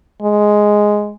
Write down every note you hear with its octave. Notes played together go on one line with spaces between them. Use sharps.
G#3